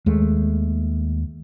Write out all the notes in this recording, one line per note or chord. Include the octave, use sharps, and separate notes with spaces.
D#2 G#3 A3